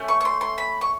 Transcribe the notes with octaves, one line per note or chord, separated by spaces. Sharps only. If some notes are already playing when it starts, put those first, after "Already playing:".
Already playing: A3 C#4
C#6
C#6
C6
C6
B5
C#6